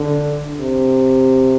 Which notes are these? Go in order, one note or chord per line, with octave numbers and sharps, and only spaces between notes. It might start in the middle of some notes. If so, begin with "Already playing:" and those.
Already playing: D3
C3